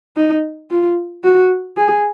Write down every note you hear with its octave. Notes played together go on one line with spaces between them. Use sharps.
D#4
F4
F#4
G#4